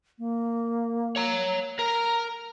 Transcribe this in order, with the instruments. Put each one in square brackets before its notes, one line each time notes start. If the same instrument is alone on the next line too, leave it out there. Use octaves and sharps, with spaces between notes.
[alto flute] A#3
[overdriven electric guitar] C#5 A#5
[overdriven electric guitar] A#4 [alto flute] A#5